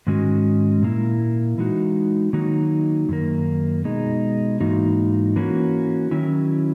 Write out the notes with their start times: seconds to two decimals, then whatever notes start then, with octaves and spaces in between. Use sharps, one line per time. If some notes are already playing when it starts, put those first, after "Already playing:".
0.07 G#2 D#3 G#3 C#4 F#4
0.82 A#2 A#3 E4
1.58 E3 G#3 D#4 F#4
2.33 D#3 F#3 A#3 D#4 F#4
3.09 F#2 D#3 A#3
3.84 B2 G#3 D#4
4.60 G#2 E3 A#3 D#4 F#4
5.36 E3 A#3 C#4 F#4
6.11 D#3 F#3 C#4 E4